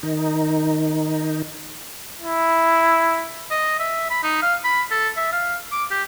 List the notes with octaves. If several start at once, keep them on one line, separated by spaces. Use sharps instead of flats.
D#3 D#4
E4
D#5
E5
B5
D#4
F5
B5
A4
E5
F5
D6
G4